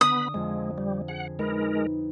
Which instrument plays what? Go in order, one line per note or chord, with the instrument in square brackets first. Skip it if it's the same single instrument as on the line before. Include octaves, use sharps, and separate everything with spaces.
[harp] D3 [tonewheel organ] B3 B5 [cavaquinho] D#6
[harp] F2 F4 [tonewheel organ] G#3
[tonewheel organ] G3
[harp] G#4 [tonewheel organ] F#5
[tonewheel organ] G#3 A#4 [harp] D#4 B4